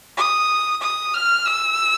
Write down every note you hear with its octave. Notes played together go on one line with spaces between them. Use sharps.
D#6
D#6
F6
E6